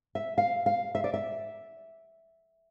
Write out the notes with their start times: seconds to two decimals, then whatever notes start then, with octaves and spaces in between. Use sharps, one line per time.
0.15 E5
0.38 F5
0.66 F5
0.95 E5
1.04 D5
1.14 E5